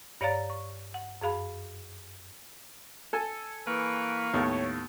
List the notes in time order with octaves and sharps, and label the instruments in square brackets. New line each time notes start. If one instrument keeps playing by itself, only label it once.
[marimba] G2 C#5 D5 F5 A#5 A6
C#6
F#5
F#2 G#4 F5 B5
[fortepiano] A4 G#5 A5
[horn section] E3 B4 [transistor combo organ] A#3 F5 C#6 [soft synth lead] D7
[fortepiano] D#2 A2 [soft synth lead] B3 [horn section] C#5